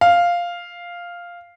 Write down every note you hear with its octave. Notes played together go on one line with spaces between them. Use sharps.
F5